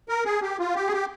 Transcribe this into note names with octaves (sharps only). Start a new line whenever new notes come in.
A#4
G#4
G4
F4
G4
G#4
G4